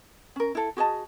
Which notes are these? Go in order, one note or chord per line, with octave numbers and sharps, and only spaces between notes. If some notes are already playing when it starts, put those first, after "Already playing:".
C#4 A#4
E4 A4
F#4 G#4 D#5 A5